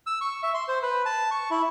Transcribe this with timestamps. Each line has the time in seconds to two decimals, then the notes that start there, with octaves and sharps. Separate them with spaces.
0.07 E6
0.21 C#6
0.43 E5
0.54 C6
0.68 C5
0.83 B4
1.06 A5
1.31 C#6
1.51 E4